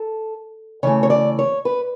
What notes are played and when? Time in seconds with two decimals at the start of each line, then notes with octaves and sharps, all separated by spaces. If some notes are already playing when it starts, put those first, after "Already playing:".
Already playing: A4
0.83 C#3 E3 A3 C#5
1.03 C#5
1.10 D5
1.39 C#5
1.65 B4